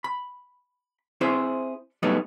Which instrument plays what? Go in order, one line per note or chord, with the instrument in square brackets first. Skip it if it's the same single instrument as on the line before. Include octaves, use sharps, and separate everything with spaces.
[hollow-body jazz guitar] B5
C4 E4 G#4 C5
F#2 A2 G3 A3 B3 D#4